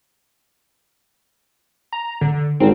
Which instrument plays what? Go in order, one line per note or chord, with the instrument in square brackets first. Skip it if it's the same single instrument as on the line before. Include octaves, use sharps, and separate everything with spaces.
[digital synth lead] A#5
D3
[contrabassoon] G#1 [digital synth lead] C4